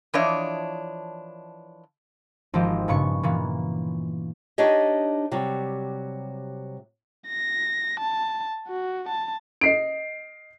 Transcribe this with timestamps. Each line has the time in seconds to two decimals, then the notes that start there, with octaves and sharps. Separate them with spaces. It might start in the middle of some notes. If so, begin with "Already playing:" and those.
0.14 E3 F3 D4 C#5 D#5
2.54 G#1 F3 G4 D#5
2.88 G2 A#2 C#3 B3 C#6 C#7
3.23 A#2 E3 A#3 B3
4.58 D4 D#4 G4 C#5 D#5
5.31 C3 F#3 G3
7.28 A#6
8.00 A5
8.68 F#4
9.09 A5
9.61 D#5 C7 D7